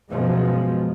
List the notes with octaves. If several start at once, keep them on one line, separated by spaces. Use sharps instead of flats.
F#2 B2 F3 G#3